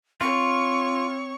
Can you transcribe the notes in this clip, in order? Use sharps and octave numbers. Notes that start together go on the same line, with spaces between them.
C4 F4 C#5 C#6